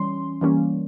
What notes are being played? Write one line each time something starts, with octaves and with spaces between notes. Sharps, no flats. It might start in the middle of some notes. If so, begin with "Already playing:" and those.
Already playing: E3 G3 C#4 C6
E3 G3 A#3 C#4